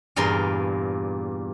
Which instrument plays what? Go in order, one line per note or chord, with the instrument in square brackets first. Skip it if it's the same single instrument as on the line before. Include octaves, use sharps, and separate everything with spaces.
[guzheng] E2 G2 A#2 A#4 C6